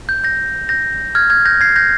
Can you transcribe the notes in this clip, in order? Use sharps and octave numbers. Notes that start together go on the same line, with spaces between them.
G6
G6 A#6
G6 A#6
F6 G#6
F6 G#6
G6 A#6
G#6 C7
G6 A#6